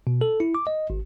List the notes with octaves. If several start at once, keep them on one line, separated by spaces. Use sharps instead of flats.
B2
A4
E4
D6
D#5
G#1